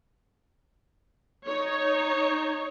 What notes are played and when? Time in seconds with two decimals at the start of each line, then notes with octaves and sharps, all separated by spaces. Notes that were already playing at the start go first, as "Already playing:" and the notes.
1.47 D#4 C#5